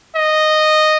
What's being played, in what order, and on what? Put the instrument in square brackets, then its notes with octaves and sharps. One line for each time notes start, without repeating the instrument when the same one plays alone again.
[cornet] D#5